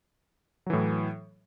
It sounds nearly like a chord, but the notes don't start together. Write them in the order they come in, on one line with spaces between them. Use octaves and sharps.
F#3 E3 A2